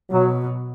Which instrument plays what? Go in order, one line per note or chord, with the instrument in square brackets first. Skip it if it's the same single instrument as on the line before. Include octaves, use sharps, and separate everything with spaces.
[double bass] B2 [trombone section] F#3